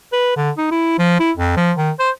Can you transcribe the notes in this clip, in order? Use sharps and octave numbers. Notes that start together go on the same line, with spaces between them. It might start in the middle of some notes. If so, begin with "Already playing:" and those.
B4
D3
D#4
E4
F3
E4
F2
F3
D#3
C5